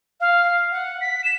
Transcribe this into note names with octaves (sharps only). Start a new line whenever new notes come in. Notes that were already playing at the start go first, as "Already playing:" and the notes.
F5
F#5
B6
E7